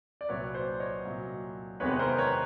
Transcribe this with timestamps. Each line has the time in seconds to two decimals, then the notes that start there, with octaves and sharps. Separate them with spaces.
0.21 D5
0.29 C2 A#2 F#3 B4 C#5
0.55 C5 D5
0.80 C#5 D#5
1.05 C2 A#2 F#3
1.80 E2 C3 D#3 G#3 B3 B4 C#5
1.99 A#4 C5
2.18 B4 C#5